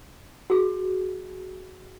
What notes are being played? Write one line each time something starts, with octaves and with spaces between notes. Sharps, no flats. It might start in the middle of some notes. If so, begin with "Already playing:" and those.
F#4 G#4